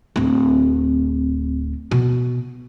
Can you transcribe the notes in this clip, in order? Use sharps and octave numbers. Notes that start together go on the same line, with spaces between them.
D1 C4
B2